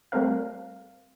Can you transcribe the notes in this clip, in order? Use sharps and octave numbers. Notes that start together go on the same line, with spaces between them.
G3 A3 C4 A#4 F5